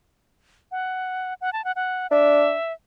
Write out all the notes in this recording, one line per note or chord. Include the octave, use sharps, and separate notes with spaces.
F#5
F#5
A5
F#5
F#5
D4 E5